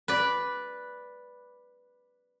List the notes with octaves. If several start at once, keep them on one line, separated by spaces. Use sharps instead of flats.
B4 D5